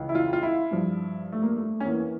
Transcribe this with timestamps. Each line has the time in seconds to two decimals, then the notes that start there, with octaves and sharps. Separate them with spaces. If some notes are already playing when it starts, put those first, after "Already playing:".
Already playing: C#2 C#3 E3
0.09 E4
0.15 F4
0.33 F4
0.43 E4
0.71 G2 F3
1.32 A3
1.43 A#3
1.57 A3
1.80 C#4
1.85 E2 E3 A#3